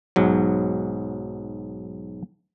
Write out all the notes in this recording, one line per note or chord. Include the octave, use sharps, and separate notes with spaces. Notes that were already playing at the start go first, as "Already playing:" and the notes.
B1 G#2 F#3